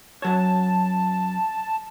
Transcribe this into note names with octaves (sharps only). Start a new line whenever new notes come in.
F#2 F#3 C#5 A5